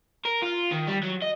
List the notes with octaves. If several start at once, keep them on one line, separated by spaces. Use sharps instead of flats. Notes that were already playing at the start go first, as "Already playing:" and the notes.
A#4
F4
D#3
G3
F#3
D#5